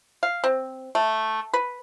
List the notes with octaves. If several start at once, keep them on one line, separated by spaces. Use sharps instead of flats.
F5
C4
A3
B4